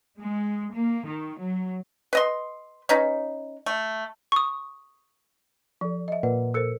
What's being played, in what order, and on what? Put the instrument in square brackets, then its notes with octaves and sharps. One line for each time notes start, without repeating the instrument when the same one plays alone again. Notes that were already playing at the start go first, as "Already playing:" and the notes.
[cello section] G#3
A#3
D#3
F#3
[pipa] B4 D#5 C6
C#4 D#4 B4
A3
[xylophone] C#6 D#6
[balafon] F3 [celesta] A4 D5
[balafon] D#5 E5
[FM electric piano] A#2 [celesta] A#4 B4 F#5 [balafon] D5
[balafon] A4 A#4 C5 [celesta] E6 C#7